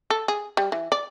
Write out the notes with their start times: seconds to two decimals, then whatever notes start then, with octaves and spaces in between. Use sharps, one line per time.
0.10 A4
0.28 G#4
0.57 G3
0.72 E3
0.92 D5